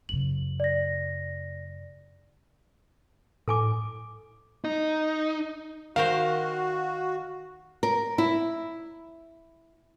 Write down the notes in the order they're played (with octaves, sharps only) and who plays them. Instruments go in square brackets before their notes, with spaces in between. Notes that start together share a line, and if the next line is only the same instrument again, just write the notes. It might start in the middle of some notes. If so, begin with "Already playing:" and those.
[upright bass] F#2 C#3 [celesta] F#7
[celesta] D5 A#6
[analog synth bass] A2 [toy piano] A4 G#5 D6
[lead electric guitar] D#4
[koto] D#3 A#4 C5 [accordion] F#4 [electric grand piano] F5
[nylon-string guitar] A#4
E4